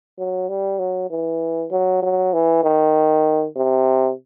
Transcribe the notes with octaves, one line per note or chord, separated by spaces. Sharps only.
F#3
G3
F#3
E3
F#3
F#3
E3
D#3
C3